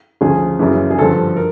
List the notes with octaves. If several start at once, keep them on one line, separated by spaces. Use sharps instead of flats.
D2 C#3 F3 G#4
F#2 C#3 E3
G#4
G2 D3 F3 A4
A#4